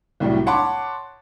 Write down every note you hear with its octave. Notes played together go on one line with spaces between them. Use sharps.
C2 A2 F#3 G3
C#5 F#5 A5 B5 C6 D6